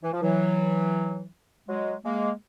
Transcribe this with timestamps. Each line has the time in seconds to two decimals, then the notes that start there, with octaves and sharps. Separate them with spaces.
0.03 E3
0.13 F3
0.22 E3 F#3
1.69 F#3 G#3
2.05 G#3 A#3